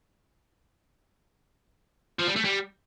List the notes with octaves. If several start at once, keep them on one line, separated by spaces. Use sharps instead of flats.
F3
G3
A3
G3